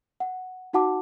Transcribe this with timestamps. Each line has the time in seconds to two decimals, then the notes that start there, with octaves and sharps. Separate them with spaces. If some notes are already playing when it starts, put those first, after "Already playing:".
0.20 F#5
0.73 D#4 F#4 F#5 A5 D6